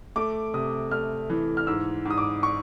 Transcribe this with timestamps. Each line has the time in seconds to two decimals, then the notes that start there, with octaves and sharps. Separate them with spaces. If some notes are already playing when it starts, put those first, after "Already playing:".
0.16 A3 D6
0.54 C3 D#6
0.91 A3 F6
1.30 E3
1.57 F6
1.67 G#2 E6
2.05 G#2 D#6
2.18 D6
2.43 C#6